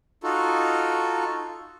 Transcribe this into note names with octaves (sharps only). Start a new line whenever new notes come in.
D#4 F4 F#4 A4